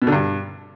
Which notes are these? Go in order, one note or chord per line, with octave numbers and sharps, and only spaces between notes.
B2
D3
G2